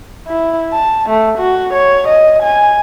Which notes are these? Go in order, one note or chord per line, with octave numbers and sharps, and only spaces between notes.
E4
A5
A3
F#4
C#5
D#5
G#5